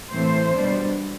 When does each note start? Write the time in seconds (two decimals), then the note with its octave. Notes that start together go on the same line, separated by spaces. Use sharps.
0.11 A2 E3 A3 C4 C5
0.53 B2 G3 B3 D4